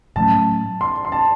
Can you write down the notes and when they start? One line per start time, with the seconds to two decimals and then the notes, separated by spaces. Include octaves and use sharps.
0.16 A2 F#3 A3 C#4 A5
0.81 C6
1.05 C6
1.12 A5